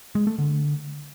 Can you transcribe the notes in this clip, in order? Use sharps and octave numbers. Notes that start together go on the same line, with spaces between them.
G#3
A3
D3